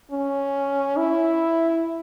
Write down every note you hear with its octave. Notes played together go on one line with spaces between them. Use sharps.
C#4
E4